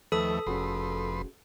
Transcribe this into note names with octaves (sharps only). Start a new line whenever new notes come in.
D#2 F3 A3 A4 B4 E5 D#6
F1 F2 C#4 F#4 G#4 B4 C6